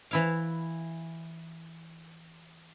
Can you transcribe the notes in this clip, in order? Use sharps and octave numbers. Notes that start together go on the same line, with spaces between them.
E3 E4 F5